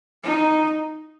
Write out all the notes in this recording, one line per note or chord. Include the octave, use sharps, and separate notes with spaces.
D#4